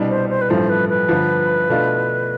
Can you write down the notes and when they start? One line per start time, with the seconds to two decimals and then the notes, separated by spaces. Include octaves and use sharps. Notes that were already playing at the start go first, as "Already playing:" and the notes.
Already playing: C2 B2 G3 D4
0.09 C5
0.29 C5
0.41 B4
0.49 A1 G2 F3 A3 C5
0.70 B4
0.89 B4
1.09 G1 G2 D3 F3
1.70 B2 A3 D4 F4